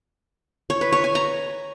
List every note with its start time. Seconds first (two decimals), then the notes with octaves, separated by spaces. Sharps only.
0.70 C#5
0.81 B4
0.92 C#5
1.04 G#5
1.15 A#5